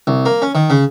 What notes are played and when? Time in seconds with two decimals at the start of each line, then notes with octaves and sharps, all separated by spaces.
0.07 C2
0.25 A#3
0.42 C#4
0.55 D#3
0.70 C#3